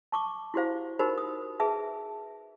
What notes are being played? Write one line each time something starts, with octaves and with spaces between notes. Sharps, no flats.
A5 C#6 D6
E4 F#4 G4 C5 F5
D#4 F#4 G4 A#4 C5 B5
D#6
G#4 B4 E5 A5